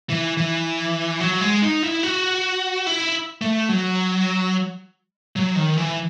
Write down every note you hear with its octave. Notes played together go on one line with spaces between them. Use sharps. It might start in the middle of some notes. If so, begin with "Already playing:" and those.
E3
E3
F#3
G#3
D#4
E4
F#4
E4
A3
F#3
F#3
D#3
E3